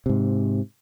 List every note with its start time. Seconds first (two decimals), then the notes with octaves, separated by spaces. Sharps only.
0.06 G#2 C3